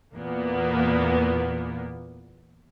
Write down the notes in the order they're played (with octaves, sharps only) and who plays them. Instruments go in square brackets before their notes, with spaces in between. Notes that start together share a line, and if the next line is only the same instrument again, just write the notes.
[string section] E2 A#2 A#3 B3